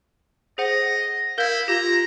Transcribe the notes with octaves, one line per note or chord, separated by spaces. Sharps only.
G#4 C5 D#5 F#5
E4 A#4 F5 G6 G7
F4 G4 A#5